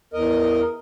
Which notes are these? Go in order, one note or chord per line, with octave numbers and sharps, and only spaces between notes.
E2 A#4 D#5